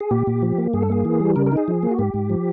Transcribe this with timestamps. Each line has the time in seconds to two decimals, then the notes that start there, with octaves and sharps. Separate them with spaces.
0.01 G#4
0.11 A#2 G4
0.27 A#2
0.42 F3
0.58 A#3
0.73 G2 G#4
0.82 A4
0.90 A#3 G#4
1.05 E3
1.20 G3
1.36 C#3 A#4
1.46 A#4
1.52 D#4
1.57 G#4
1.68 F3
1.83 A#3
1.91 F#4
1.99 G#2 G4
2.14 G#2
2.30 F3